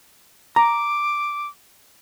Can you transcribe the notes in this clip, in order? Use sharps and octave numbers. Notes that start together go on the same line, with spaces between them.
A#5 D6